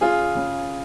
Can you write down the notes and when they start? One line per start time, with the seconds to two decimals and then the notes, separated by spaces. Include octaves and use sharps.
0.01 C#3 F4 G#4
0.35 C#3